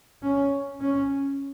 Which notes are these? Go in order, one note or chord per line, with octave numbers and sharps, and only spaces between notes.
C#4
C#4